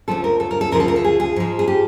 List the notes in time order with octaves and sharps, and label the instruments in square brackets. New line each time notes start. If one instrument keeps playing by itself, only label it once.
[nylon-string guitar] D2 C#3 F3 A4
A#4
A4
A#4
A4
D2 C#3 F3 A#4
A4
A#4
A4
G#4
G#4
G#2 F3
G#4
G4